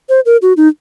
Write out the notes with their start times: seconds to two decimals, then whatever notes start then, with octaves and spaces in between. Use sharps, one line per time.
0.09 C5
0.26 A#4
0.42 F#4
0.57 D#4